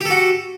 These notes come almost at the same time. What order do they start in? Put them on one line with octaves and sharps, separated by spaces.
G4 A4 F#4